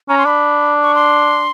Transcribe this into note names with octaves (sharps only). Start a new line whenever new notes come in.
C#4 A#5
C6
D4 B5
C#6
C6